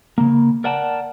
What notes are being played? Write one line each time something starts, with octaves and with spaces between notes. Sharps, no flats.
C#3 A#3
A#4 D5 F#5 G5 A5